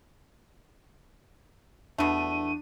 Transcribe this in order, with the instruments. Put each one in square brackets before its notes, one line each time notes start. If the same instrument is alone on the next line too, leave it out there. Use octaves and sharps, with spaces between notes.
[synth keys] E2 D4 D#7 [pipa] B2 A3